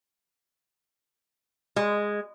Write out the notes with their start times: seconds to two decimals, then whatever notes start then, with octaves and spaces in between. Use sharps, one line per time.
1.76 G#3